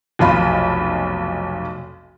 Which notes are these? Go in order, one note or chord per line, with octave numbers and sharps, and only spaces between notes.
F1 B1 F4 B5